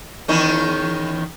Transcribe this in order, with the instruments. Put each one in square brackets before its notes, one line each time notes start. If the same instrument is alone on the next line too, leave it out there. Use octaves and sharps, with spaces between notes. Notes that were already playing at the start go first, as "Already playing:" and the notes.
[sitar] E2 D#3 C#4